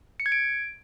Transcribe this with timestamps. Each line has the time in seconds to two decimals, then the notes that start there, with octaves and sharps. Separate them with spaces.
0.20 C#7
0.26 G#6
0.32 D7